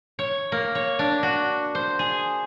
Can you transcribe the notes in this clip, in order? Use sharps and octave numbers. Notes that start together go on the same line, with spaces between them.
C#5
A#3
C#5
D4
F#4
C5
G#4